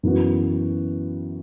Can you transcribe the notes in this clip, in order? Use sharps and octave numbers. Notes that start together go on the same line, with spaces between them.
F#2 E3 B3 F#4